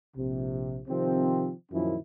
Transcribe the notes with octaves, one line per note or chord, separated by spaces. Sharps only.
A#1 C3
C3 D#3 F3 C4
F#2 A#2 D#3 F3 C#4 E4